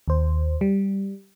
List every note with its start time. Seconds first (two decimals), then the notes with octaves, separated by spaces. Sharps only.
0.08 D#2 C5
0.61 G3